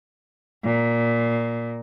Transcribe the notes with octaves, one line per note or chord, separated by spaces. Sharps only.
A#2